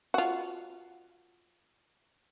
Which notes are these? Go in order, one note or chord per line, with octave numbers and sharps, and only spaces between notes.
F4 F#4